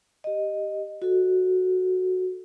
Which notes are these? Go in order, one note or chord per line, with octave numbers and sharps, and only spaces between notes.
G4 D#5
F#4 A4